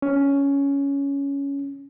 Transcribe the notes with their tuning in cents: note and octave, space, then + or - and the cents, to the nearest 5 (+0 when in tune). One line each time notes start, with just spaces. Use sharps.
C#4 +10